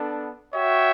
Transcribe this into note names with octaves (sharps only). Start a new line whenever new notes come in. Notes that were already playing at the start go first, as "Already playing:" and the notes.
Already playing: B3 D4 A4 D5
F#4 C#5 E5 G5